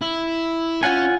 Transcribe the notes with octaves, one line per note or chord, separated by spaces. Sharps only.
E4
C#4 F4 F#5 G#5